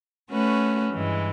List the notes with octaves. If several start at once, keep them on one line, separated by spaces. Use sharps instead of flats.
A3 C#4 F#4 B4
G2 E3 G#3